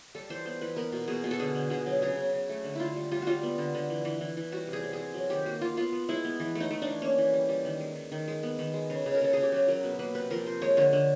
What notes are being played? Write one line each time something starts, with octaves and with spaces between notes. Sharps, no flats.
G3 A4
E3 C5
B3 C5
E3 B4
B3 A#4
B2
B2 G#4
B2
A4
D3 G#4
D3
D3 G#4
F#3
C#3 G#4
C#3
C#3
A3
D3
D3 E4 F4
G3
G3 F4
G3 F4 F#4
B3
D3
D3
E3
E3
E3
E3
G3 F#4
C3
G#4
C3
G#4
C3
F#3
D#3 G4
A#3 F#4
A#3 F4
B3 F4
B3
G#3 E4
B3
E3
A3
D#4
A3
E3 D4
A#3 C#4
E3
G3
G3
D#3
G#3
D#3
D#3
G#3
B3
D#3
G#3
C#3
C#3
A#4
C#3 A4
C#3 G#4
G4
F#3 F#4
F#3 A#4
B2 B4
A#3 B4
C3 B4
F3 A#4
C3 C5
G#3 C#5
D3 C#5
D3